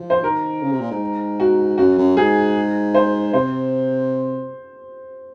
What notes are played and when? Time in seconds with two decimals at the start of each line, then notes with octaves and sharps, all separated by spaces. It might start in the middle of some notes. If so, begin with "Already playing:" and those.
Already playing: F3
0.10 C5
0.23 D#3 A#4
0.62 C#3
0.72 C3
0.81 A#2
0.91 G#2
1.40 F#4
1.78 F#2 F#4
1.98 F#2
2.17 G#2 G#4
2.94 C5
3.33 C3 C5